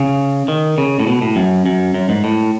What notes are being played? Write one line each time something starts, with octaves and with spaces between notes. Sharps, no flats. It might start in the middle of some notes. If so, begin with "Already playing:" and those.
Already playing: C#3
D#3
C#3
A2
B2
A2
F#2
F#2
F#2
G#2
A2